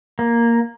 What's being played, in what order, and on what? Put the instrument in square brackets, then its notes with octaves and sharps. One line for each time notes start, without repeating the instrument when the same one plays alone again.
[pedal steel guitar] A#3